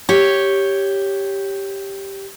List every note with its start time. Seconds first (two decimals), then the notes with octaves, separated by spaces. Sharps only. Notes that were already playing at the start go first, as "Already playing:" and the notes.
0.09 G4 C#5